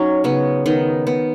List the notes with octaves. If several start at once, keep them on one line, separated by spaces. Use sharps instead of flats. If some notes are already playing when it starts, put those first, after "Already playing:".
Already playing: F#3 C#4 D#4
C#3 B3
D#3 B3
B3